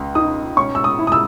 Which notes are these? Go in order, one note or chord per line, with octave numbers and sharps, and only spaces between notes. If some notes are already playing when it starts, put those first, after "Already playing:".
Already playing: C#2
D#4 D#6
C#4 C#6
E6
D#6
E4
D#6
E6